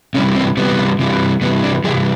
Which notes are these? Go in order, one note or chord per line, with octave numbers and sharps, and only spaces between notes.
C3 E3 G3 C#4
C4
C3 E3 G3 B3
C3 E3 G3
C3 E3 G3 B3
D4
C3 E3 G3 G#4